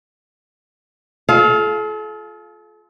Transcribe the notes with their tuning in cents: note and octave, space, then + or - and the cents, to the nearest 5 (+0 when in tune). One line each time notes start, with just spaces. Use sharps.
F4 +0 A4 -45 F5 +0